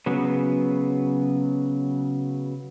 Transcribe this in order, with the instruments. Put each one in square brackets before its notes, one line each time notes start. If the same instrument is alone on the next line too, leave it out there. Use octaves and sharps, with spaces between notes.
[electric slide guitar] C#3 F#3 B3